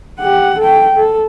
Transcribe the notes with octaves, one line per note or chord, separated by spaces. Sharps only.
G4 F#5
A4 G5
A4